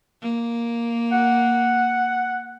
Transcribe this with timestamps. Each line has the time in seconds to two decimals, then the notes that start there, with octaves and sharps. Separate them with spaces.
0.22 A#3
1.12 F#5